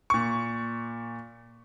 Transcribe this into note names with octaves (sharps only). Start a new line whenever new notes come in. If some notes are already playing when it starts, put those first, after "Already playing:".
A#2 C#6